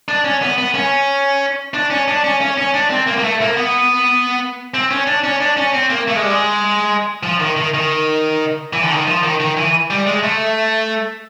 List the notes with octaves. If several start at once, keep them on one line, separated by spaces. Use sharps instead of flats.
D4
C#4
B3
B3
C#4
D4
C#4
D4
C#4
C#4
C#4
D4
C4
A#3
A#3
A3
A#3
B3
C4
C#4
D4
C#4
D4
C#4
C4
A#3
A3
G#3
G3
G#3
F3
D#3
D#3
D#3
E3
D3
D#3
F3
D#3
D#3
E3
G3
G#3
A3